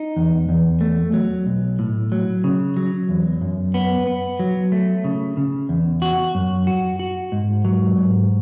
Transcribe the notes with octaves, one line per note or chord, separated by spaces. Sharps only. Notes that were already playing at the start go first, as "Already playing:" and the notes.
Already playing: D#4
E2
E2
A3
F#3
B1
A2
F#3
C#3
F#3
E2
F#2
B3
B3
F#3
A3
C#3
C#3
E2
F#4
F#2
F#4
F#4
G#2
F#3
G#2